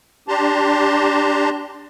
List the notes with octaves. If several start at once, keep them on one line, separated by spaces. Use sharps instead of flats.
D4 G4 A5 A#5 C6